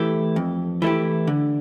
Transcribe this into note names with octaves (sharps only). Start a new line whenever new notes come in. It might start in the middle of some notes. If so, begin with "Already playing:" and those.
Already playing: E3 A3 E4 G4
F2
E3 A3 E4 G4
D3